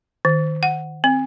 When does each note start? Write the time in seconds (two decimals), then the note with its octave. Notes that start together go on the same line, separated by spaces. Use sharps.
0.25 D#3
0.63 F#5
1.04 C4